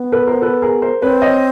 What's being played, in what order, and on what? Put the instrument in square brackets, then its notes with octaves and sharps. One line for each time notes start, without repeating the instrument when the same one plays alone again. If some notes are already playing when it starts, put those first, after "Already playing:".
Already playing: [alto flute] B3
[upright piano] A4 B4
A#4 C5
A4 B4
G#4 A#4
A#4 C5
[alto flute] C4 [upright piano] B4 C#5
[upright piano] C#5 D#5